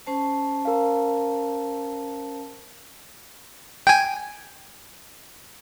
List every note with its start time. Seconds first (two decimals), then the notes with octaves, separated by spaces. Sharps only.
0.07 C#4 C5 A5
0.65 A#4 F5
3.87 G5 G#5